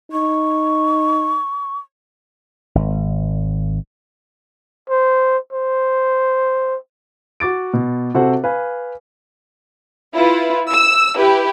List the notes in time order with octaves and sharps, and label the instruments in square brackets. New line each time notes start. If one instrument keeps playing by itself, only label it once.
[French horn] D#4 [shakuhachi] C#6
[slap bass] G#1
[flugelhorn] C5
C5
[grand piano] F#4 D6 A6 D7
B2
C3 F#4 A4 C5 F#5
B4 F5 G#5
[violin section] E4 F4 B4
E6
E4 G4 B4